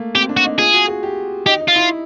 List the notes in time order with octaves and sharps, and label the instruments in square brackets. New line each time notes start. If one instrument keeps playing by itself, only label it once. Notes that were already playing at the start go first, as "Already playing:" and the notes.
Already playing: [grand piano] A3 A#3
[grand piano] C4 [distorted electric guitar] G4
[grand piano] D4
[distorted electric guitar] F#4
[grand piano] D#4
[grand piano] F4 [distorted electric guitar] G#4
[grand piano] F#4
G#4
G4
[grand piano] D#4 [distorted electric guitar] G4
[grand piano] D#4
[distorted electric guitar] F4
[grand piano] E4